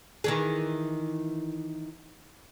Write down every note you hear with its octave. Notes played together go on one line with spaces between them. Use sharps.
D#3 E3 G#4